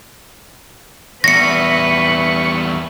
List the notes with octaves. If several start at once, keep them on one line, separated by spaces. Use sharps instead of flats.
E2 G3 B4 C#6 A#6 C#7